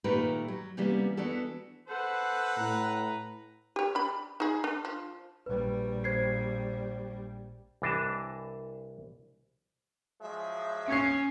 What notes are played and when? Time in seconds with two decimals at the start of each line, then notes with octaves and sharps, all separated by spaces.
0.04 A#2 D#3 A3 G4 A#4 B4
0.48 F#3
0.77 C3 E3 G3 A#3 B3 C#4
1.17 E3 B3 D4 F#4 A4
1.88 A4 B4 C5 F#5
2.57 A2 A#5
3.76 G4 C#5
3.95 D4 B5
4.40 D#4 G#4
4.64 D4
4.85 F3
5.46 A#1 G3 B4
6.04 C5 G#6 C7
7.82 C2 E3 D4 D#5 A5
10.21 F3 F#3 G#3 E5
10.89 C#4 C#6 G#6 C7